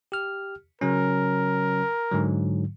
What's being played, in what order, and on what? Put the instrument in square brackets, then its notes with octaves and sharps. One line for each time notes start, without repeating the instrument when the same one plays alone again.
[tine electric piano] G4 F6
[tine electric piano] C#3 F#3 C#4 [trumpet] A#4
[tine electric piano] G#2 D3 F#3